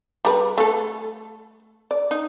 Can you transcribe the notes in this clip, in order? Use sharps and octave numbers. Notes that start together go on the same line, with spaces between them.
G3 A#4 B4
A3 A4
D5
D#4